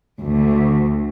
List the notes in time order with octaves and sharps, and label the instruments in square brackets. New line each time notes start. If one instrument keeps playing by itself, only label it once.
[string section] D2